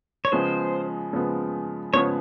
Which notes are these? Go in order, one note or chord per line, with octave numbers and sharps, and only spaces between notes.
C#5
C#3 F3 G#3 B3 C5
C#3 F3 G#3 B3
C#3 F3 G#3 B3 C#5